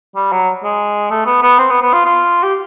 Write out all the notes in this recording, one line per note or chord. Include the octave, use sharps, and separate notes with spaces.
G3
F#3
G#3
A3
B3
B3
C4
B3
B3
F4
F4
G4